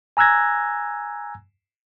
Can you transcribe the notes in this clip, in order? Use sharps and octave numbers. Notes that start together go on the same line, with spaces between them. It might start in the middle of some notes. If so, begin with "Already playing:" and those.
G#5 A#5 E6 F#6 G#6 A#6